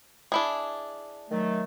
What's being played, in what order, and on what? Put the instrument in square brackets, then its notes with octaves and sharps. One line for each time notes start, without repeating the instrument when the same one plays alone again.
[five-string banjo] D4 E4 G#4
[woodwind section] D#3 F#3 A3